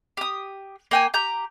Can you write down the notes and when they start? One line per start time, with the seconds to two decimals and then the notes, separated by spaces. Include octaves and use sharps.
0.17 G4 D#6
0.91 A#3 G5 G#5
1.14 G4 A#5 G6